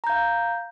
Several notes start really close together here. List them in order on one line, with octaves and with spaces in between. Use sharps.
A#5 G6 F5